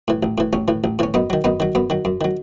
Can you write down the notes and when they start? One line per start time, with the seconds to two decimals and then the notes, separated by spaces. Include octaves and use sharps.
0.08 A2 E3
0.23 A1
0.38 A2 E3
0.53 A1 C#4
0.68 A2 E3
0.84 A1
0.99 A2 E3 C#4
1.14 F#2 B3 D#4
1.30 D#3 F#3
1.44 F#2 B3 D#4
1.60 D#3 F#3
1.75 F#2 B3
1.90 D#3 F#3
2.05 F#2
2.21 D#3 F#3